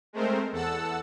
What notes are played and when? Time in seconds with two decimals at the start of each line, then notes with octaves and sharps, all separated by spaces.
0.13 G#3 A3 C4 A#4 C5
0.52 E2 A4 F#5 A5 E6